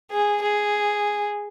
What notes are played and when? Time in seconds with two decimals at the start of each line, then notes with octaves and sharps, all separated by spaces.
0.11 G#4
0.42 G#4